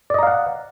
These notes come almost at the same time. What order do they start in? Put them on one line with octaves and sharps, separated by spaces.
D5 D#5 A#5 F5 F#5